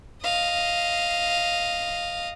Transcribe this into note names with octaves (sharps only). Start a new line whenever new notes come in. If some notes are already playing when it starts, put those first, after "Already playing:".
D#5 F5